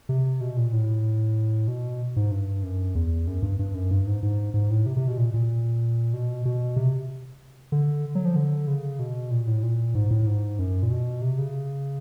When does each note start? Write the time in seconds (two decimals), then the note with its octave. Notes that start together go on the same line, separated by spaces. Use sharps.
0.09 C3
0.41 B2
0.57 A#2
0.73 A2
1.68 B2
2.16 G#2
2.31 G2
2.63 F#2
2.95 E2
3.27 F#2
3.42 G2
3.59 G2
3.74 F#2
3.91 G2
4.07 G#2
4.23 G#2
4.54 G#2
4.70 A2
4.86 C3
4.96 C3
5.08 B2
5.18 A#2
5.34 A#2
6.13 B2
6.45 B2
6.76 C3
7.72 D3
8.15 F#3
8.25 F3
8.36 D3
8.67 C#3
8.99 B2
9.31 A#2
9.47 A2
9.63 A#2
9.95 G#2
10.11 A2
10.27 G#2
10.59 F#2
10.83 A#2
10.91 B2
11.22 C3
11.38 C#3